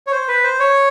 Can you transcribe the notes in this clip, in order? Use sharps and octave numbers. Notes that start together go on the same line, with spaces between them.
C#5
C5
B4
C5
C#5